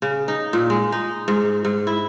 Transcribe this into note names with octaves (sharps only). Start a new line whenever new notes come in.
C#3
D#4
A#2
G#3
D#4
G#2
G#2
E4